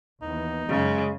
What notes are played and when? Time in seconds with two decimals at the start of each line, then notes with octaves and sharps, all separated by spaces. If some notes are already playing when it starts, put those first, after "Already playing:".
0.22 D#2 E3 B3 D#4
0.69 F#2 C#3 G#3